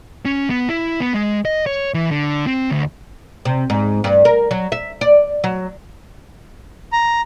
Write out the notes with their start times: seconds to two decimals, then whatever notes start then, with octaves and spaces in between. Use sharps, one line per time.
0.25 C#4
0.50 B3
0.69 E4
1.00 B3
1.14 G#3
1.45 D#5
1.66 C#5
1.94 E3
2.11 D3
2.47 C4
2.70 D2
3.45 C3
3.70 G#2
4.04 G2
4.25 A#4
4.51 F#3
4.72 E5
5.01 D5
5.44 F#3
6.92 A#5